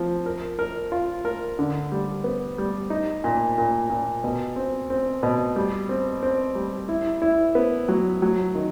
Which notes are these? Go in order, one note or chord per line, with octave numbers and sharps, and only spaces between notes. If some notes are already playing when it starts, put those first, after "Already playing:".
Already playing: F3 C4
A#4
A#4
F4
A#4
D3
G3
B3
G3
D#4
A#2
A#2
A#2
B2
C4
C4
B2
G3
C4
C4
G3
E4
E4
B3
F#3
F#3
D#3